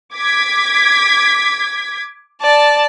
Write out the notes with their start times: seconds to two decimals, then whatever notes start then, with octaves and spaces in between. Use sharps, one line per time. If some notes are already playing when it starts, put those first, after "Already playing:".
0.15 D6 G#6 B6
2.41 D5 A5